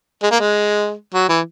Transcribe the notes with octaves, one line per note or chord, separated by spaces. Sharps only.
G#3
A#3
G#3
F#3
E3